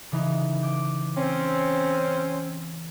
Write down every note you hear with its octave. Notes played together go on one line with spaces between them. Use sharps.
C#3 E3 D#4
D6 G6
C4 C#4